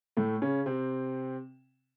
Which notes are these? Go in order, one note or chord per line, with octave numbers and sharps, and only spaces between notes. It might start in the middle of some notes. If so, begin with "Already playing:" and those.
A2 A3
C#3 C#4
C3 C4